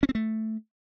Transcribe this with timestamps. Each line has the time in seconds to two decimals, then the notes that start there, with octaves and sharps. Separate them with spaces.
0.03 C#4
0.09 C4
0.15 A3